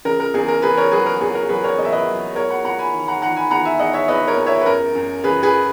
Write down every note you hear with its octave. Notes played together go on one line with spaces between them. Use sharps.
C#3 A#4
A#4
E2 G#4
A#4
C#3 G#4 B4
A#4 C#5
F#3 G#4 B4
A#4
E2 G#4
A#4
F#3 G#4 B4
A#4 C#5
E2 D#5
E5
B4 D#5
F#3
E2 A#4 C#5
F#5 A#5
E2 F#5 A#5
G#5 B5
D#3
F#5 A#5
D#3 F#5 A#5
G#5 B5
E2 F#5 A#5
E5 G#5
E2 D#5 F#5
C#5 E5
E2 B4 D#5
A#4 C#5
E2
C#5 E5
B4
F#2 A#4
F#2
C#3 G#4 B4
G#4 B4